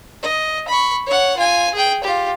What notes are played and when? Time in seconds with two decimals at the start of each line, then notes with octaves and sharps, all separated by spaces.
0.22 D#5
0.68 B5 C#6
1.06 C#5 F#5
1.37 F4 G#5
1.74 G#4 G5
2.04 F4 G4